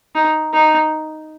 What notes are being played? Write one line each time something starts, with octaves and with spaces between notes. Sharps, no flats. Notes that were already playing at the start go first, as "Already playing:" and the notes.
D#4
D#4